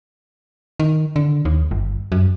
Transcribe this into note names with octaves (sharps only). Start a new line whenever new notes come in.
D#3
D3
D#2
G1
F#2